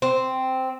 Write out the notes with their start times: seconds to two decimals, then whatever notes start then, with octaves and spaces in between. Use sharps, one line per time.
0.02 C4